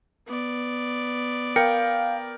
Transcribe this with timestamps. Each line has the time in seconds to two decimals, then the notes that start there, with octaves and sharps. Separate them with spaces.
0.27 B3 D5
1.56 A#4 F5 G5 C#7